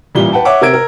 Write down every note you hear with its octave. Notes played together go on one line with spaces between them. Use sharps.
A1 A#2 G3 G7
B4 F#5 G5 A5
C#5 E5 F#5 D6
C3 A#4 E6 G#6 D7
A#4